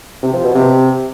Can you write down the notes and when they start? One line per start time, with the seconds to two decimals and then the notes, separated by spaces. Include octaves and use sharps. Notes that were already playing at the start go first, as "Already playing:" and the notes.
0.23 C3
0.34 F3
0.44 B2
0.55 C3